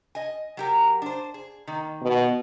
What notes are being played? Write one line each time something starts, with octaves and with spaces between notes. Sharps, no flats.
D#5 G#5
F#3 G4 A#4
D4 C5
G#4
D#3 A#3
B2